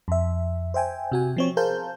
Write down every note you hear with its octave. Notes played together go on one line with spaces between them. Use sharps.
F2 E5
C5 E5 G5 G#5
C3 F#4 G#5
F3 C4 C#5
G#4 A#4 C5 F5 A5 G6